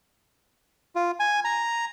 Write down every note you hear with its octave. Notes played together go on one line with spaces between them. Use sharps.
F4
G#5
A#5